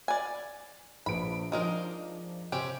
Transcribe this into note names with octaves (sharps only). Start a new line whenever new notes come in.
D5 G#5
A#1 B4 B5 D7
F3 G#3 D4 D#4 A#4
C3 C4 C#4 G4